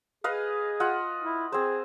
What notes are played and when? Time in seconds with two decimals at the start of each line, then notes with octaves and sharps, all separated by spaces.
0.24 G#4 B4 D#5 F5
0.80 F4 D#5 F#5
1.21 E4
1.52 C4 G#4 C5